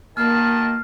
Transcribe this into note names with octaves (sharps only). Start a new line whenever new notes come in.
B2 D#3 A#3 A5 F6 C7 E7